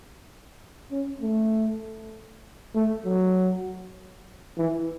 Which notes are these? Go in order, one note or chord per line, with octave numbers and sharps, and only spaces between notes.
C#4
A3
A3
F#3
E3